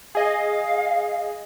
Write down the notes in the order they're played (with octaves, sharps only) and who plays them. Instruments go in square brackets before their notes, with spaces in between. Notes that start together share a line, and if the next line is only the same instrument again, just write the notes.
[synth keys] G#4 D#5 [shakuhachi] F5